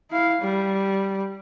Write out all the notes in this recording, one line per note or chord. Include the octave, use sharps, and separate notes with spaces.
E4 F5
G3